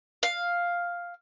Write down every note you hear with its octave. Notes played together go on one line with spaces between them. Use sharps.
F5